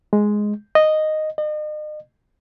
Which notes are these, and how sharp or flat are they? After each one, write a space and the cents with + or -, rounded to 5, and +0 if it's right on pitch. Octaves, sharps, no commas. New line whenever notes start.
G#3 +5
D#5 -5
D#5 -40